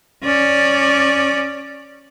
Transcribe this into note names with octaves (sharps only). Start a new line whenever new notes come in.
C#4 D5